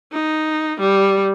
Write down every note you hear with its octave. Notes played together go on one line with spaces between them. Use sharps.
D#4
G3